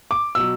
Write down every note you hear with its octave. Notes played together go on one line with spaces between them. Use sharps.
D6
B2 F#3 E6